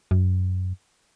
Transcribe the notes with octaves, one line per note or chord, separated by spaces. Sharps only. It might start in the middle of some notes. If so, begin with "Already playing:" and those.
F#2